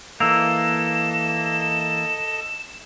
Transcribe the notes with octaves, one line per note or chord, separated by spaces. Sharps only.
E3 A#3 A4 D#5 E6 E7 F7